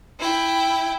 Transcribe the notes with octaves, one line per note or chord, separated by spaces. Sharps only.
E4 G5